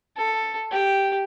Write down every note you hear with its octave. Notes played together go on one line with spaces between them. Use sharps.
A4
G4